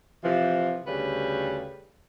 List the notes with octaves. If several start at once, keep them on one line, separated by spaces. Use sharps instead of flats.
C3 E3 F3
D2 C#3 G3 B4